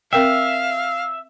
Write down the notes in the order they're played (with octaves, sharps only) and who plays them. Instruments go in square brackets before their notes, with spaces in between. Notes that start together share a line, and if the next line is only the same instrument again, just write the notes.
[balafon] C4 A#4 G5 [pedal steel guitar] E5 [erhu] F5